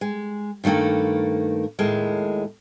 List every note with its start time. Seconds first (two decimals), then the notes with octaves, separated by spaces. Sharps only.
0.01 G#3
0.64 G2 D#3 A3 A#3 A4
1.79 D#2 A2 G#3 A#4 A5